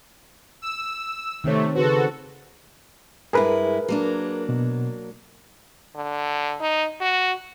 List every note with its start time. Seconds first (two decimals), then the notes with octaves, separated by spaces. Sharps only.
0.62 E6
1.44 C3 D#3 A3 C4 C#5
1.75 C#3 F#4 A4 B4 C5
3.33 G2 G#3 E4 G#4 A#4 B4
3.88 F#3 A#3 D4
4.49 B2
5.96 D3
6.61 D#4
7.01 F#4